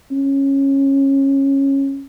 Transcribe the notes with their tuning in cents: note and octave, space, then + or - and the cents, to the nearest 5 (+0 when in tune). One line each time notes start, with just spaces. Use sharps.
C#4 -15